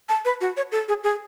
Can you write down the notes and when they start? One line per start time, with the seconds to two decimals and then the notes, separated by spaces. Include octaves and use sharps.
0.09 A5
0.25 B4
0.41 F#4
0.57 C#5
0.72 A4
0.88 G#4
1.04 G#4